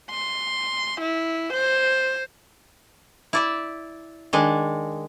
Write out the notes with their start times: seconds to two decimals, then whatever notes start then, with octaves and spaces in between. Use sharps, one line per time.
0.11 C6
1.00 E4
1.53 C5
3.33 E4 D5 E5
4.33 D#3 G#3 D4